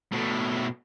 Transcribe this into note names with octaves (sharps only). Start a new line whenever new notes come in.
B2 A3